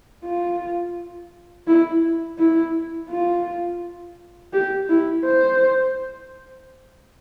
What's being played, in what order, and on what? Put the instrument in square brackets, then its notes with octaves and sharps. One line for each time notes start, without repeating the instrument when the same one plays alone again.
[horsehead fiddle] F4
E4
E4
F4
G4
E4
C5